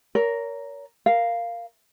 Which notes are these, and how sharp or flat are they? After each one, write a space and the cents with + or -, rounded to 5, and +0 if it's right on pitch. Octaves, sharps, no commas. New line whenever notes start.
A#4 +0 C#5 +30
A#4 +0 F5 -5